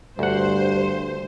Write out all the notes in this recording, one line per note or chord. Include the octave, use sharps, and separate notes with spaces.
D2 G2 C5 F#5